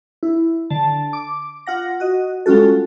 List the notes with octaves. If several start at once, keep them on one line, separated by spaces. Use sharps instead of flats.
E4
D3 A5
D6
F4 F#5 A#6
F#4 D#5
G3 G#3 C#4 F4 F#4 A4